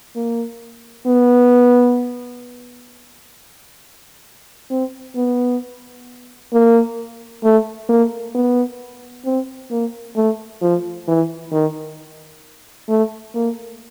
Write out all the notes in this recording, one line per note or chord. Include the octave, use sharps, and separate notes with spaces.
A#3
B3
C4
B3
A#3
A3
A#3
B3
C4
A#3
A3
F3
E3
D#3
A3
A#3